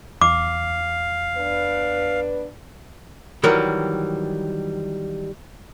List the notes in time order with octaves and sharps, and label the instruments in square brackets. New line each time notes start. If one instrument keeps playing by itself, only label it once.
[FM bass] E2 [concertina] F5 [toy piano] D6
[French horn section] B3 D4 B4
[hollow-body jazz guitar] D#3 E3 F#3 G3 A#4